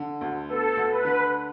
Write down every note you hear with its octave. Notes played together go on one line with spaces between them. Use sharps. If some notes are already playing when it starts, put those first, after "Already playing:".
Already playing: D3
D2
B3 A4
D2
B4
D3